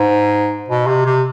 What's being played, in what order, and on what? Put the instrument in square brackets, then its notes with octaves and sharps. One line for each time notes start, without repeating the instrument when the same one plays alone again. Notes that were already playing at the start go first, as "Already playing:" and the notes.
Already playing: [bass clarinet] G#2
B2
C3
C3